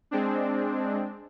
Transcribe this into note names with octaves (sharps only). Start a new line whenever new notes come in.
G#3 C4 D4